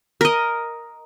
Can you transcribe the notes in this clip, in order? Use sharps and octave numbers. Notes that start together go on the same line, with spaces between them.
A#4 D#5